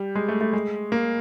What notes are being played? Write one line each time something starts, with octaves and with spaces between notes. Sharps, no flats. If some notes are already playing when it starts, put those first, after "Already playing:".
Already playing: G3
G#3
A3
A3
G#3
A#3